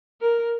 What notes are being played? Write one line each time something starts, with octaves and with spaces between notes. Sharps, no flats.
A#4